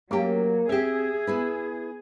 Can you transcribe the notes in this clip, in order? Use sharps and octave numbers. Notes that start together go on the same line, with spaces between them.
F#3 A3 A#3 C#4 G4
C4 G4 G#4 E5
B3 E4 B4